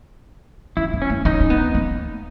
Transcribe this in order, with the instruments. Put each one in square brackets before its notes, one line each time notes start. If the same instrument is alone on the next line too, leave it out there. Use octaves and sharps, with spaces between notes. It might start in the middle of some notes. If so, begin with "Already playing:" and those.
[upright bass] C#4 [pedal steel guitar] E4
[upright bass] B3
[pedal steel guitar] C#4
[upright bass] A#3
[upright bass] C#4 [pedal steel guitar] D#4
[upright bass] C#4
B3
A#3